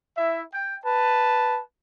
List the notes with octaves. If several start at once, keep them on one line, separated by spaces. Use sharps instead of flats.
E4 E5
G5
B4 A5